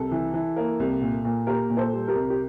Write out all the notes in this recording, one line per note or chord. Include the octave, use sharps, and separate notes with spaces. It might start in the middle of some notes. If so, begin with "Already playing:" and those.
Already playing: C2 A4
E3
E3
A#3
C2
A#2
A#2
A#3 G4 A#4
A#2
A4 C5
G3
G4 A#4
C2
G4